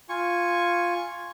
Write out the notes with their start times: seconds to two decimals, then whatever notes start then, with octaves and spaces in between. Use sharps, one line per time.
0.09 F4 G#5 C#6